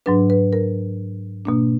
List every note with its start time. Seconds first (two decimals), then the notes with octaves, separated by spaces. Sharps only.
0.06 G#2 F#3 D4 B4
0.30 B4
0.53 A#4
1.45 B2 A#3 D4